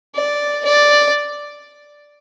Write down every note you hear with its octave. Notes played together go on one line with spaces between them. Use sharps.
D5
D5